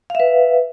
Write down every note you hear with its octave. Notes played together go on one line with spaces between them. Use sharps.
B4 E5 F5